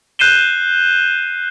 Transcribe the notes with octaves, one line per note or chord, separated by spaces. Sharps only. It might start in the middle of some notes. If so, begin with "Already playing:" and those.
F#6 G6 C7 D#7 E7 G7